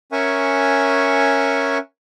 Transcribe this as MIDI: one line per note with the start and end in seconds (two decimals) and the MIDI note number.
0.12 1.78 61
0.12 1.78 70
0.12 1.78 76
0.12 1.78 78
0.12 1.78 80
0.12 1.78 85